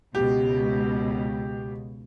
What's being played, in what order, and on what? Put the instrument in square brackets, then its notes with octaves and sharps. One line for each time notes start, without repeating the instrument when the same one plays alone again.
[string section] C#2 B2 [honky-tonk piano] G4